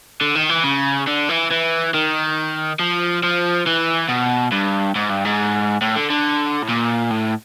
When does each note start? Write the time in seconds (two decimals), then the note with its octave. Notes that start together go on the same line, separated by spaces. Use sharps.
0.21 D3
0.35 D#3
0.49 E3
0.64 C#3
1.07 D3
1.29 E3
1.50 E3
1.94 D#3
2.80 F3
3.23 F3
3.67 E3
4.09 B2
4.52 G2
4.96 G#2
5.10 G2
5.25 G#2
5.82 A2
5.96 D3
6.10 D3
6.63 A2
6.69 A#2
7.11 A2